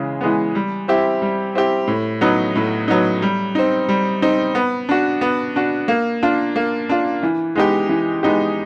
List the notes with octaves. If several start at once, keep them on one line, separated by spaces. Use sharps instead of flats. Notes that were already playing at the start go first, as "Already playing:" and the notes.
Already playing: C#3 E3 G#3
E3 G#3 B3
G3
C4 E4 G4
G3
C4 E4 G4
A2
F#3 B3 D#4
A2
F#3 B3 D#4
G3
C4 D#4
G3
C4 D#4
B3
D4 F#4
B3
D4 F#4
A#3
D4 F4
A#3
D4 F4
E3
G#3 B3 D#4 G4
E3
G#3 B3 D#4 G4